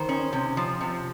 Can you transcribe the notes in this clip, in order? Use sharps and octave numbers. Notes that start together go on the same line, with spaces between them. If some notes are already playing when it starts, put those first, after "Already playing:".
Already playing: D#3 C5
C#4
C3
F3
C3